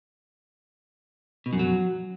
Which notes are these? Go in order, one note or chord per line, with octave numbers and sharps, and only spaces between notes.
B2
F#2
F#3